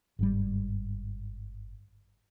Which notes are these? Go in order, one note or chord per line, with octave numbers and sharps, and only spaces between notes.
G1 G#2 G3